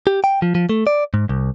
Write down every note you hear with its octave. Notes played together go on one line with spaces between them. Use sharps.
G4
G5
F3
F3
A3
D5
G#2
C2